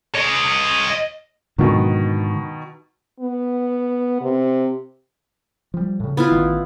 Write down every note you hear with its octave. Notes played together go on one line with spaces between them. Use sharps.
C#5 D#5
G#2 B2 D3 D#3 F#3
B3
C3
F3 G3
A2 C#3
B3 E4 F4
A1 D#3